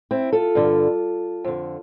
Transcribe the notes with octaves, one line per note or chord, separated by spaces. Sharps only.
C4 E4
F4 A4
G2 D3
F2 D3